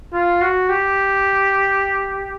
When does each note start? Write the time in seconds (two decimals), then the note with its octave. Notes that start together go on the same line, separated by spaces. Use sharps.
0.13 F4
0.42 F#4
0.69 G4